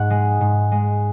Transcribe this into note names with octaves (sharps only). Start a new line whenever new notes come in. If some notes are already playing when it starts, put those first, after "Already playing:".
Already playing: G#2 F#5
G#3
G#2
G#3